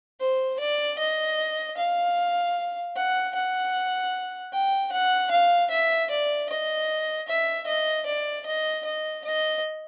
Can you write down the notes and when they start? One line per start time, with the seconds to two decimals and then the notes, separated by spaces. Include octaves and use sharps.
0.20 C5
0.60 D5
0.99 D#5
1.77 F5
2.96 F#5
3.35 F#5
4.53 G5
4.92 F#5
5.31 F5
5.71 E5
6.10 D5
6.50 D#5
7.28 E5
7.67 D#5
8.06 D5
8.46 D#5
8.85 D#5
9.25 D#5